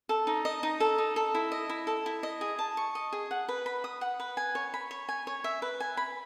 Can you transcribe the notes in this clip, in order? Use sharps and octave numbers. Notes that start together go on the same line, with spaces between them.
A4
D#4
D#5
D#4
A4
D#4
A4
E4
D#5
E4
A4
E4
D#5
G#4
A5
C#6
D#5
G#4
F#5
B4
B5
D#6
F#5
B4
G#5
C#5
B5
C#5
G#5
C#5
E5
B4
G#5
B5